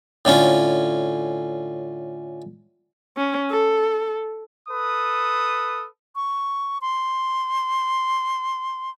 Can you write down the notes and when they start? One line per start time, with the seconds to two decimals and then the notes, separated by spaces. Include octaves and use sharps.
0.25 A2 D3 C#4 F4
3.17 C#4
3.51 A4
4.69 A4 B4 D#6
6.16 C#6
6.81 C6